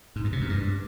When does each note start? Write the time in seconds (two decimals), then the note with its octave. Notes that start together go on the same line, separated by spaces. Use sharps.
0.16 G#2
0.24 G2
0.32 C3
0.41 F#2
0.49 G2